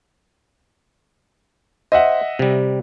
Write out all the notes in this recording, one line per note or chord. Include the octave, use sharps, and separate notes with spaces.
C5 D#5 E5 F#5
C3 G3